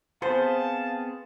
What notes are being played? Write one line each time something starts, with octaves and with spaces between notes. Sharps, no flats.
B3 C4 G#4 C5 F5 A5